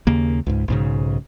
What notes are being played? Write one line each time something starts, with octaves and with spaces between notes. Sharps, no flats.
D#2 C#3 A#3
C#2 G#2
B1 G#2 C#3